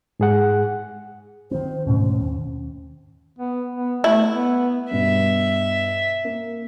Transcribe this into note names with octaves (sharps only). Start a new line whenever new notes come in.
G#2 G#4 F#5
D#3 C4 C5
D2 G#2 B2 C#4
D#2
B3
B3
A3 E4
B3
G2 B2 E5
A#3